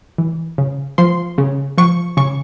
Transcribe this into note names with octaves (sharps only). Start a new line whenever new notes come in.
E3
C#3
F3 C6
C#3
F3 C#6
C#3 C#6